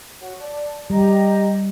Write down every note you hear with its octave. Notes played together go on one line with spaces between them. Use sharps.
F#4 C#5
D5 A5
G3 G4 D#5 A#5